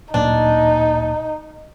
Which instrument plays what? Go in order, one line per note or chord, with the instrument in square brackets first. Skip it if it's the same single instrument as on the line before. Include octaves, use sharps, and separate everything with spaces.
[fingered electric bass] D1 A#2 [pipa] D4 [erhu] D#4